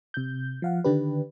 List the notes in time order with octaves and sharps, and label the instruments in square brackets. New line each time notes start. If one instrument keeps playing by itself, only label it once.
[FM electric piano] C3 G6
F3 F5 F#5
D3 D#3 D4 G4 B4